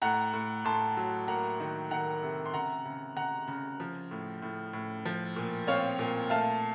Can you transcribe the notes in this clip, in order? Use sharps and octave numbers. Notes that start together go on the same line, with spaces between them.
A2 F#5 A#5
A2
A2 A5 C6
F#3
A#3 F#5 A#5
D#3
D#3 F#5 A#5
C3
C6
C#3 F#5 A#5
C#3
C#3 F#5 A#5
C#3
F3
A2
A2
A2
F3
A#2
C4 C#5 F5
A#2
A3 F5 A5